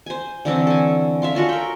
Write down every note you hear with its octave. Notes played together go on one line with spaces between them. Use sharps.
C5 G#5
D3 E3 C4 C#4
A4 G#5
E5 F5 C6
C#4 F4 F#4 A4
A#4 G5